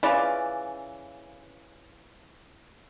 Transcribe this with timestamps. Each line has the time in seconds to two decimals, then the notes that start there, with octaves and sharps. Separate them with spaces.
0.03 C#3 E3 F4 D5